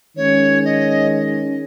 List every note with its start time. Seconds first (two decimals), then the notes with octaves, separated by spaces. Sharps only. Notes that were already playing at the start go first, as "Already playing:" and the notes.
0.16 D#3 G#3 C#4 G#4 C#5
0.64 D#5